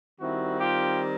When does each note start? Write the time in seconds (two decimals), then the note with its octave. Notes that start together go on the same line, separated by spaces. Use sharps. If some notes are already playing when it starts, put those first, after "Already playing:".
0.20 D#3 G3 C4 E4 F#4
0.59 F4 G4